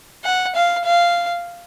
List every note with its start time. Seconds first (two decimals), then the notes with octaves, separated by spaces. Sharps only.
0.24 F#5
0.55 F5
0.85 F5